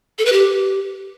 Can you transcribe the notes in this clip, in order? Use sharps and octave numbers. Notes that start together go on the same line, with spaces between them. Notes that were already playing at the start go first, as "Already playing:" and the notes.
A4
B4
G4